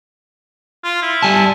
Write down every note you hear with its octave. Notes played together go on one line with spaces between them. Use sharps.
F4
E4
G3 G#5 A5